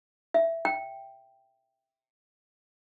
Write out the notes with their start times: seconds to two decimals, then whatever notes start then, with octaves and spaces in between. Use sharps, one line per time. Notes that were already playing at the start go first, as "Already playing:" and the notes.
0.34 E5
0.65 G5